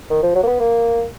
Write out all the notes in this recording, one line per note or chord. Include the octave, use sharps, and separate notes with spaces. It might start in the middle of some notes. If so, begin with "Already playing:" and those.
D#3
F3
F#3
A#3
B3
A#3